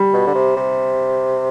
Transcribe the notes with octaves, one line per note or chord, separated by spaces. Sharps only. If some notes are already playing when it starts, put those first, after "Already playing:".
Already playing: G3
B2
D3
C3
C3